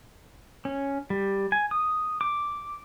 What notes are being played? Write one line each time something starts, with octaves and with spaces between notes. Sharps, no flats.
C#4
G3
G#5
D#6
D6